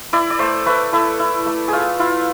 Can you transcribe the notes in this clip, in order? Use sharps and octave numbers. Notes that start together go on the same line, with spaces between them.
E4 D5
D5
A3 C5
A3 B4
E4 A4
E4
A3
A3 F4 G#4
E4 F4